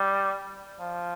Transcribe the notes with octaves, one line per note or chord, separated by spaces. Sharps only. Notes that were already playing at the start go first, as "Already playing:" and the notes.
Already playing: G3
F3